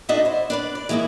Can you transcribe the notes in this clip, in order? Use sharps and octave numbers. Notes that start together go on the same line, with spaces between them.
D4 D#4 F#4 A4 D#5 E5
E4 C5
D4 B4 D5
D5
E3 G#3 A#3 B3 E4